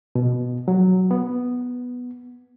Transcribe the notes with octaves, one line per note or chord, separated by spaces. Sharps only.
B2
F#3
B3